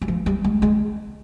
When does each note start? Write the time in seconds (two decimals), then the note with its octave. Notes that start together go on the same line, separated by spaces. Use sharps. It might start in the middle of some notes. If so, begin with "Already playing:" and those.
0.02 G3
0.08 F3
0.26 G3
0.44 G#3
0.62 G#3